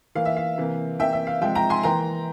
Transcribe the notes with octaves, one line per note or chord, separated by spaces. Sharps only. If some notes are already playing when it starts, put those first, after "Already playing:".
E3 A#3 F5
E5
F5
C3 E3 A#3
C3 E3 A#3 E5 G5
E5
F5
C3 F3 G#3 E5 G5
G5 A#5
G#5 C6
E3 A#3 G5 A#5